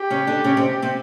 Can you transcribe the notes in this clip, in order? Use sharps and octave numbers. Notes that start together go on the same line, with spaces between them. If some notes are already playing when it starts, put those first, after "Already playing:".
Already playing: G4
C#3 C#4
D3 D4
C#3 C#4
C3 C4
C3 C4